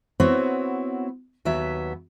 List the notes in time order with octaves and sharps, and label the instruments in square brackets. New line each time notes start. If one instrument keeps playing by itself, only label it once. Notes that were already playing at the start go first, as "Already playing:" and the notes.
[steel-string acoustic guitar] B3 C4 E4 F#4 C#5
D#2 F#3 B3 E5